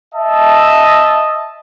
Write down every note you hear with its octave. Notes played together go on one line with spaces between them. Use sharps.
D#5 E5 A5